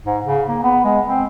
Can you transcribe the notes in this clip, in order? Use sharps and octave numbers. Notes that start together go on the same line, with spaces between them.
G#2
C#3
A#3
B3
G#3
C4